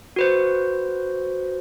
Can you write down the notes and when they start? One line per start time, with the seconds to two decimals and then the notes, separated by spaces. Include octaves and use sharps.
0.16 F#4 B4 C5